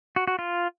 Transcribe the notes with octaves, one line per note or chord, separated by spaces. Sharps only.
F#4
F#4
F4